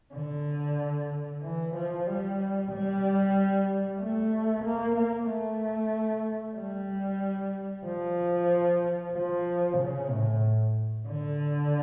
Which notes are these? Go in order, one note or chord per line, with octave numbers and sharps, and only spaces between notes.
D3
E3
F3
G3
G3
A3
A#3
A#3
A3
G3
F3
F3
C#3
A2
D3